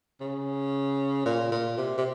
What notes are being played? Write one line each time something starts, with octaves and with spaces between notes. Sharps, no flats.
C#3
A#2
A#2
C3
C3